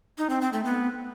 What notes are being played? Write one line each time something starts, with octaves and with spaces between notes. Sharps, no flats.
D#4
C4
C4
A3
B3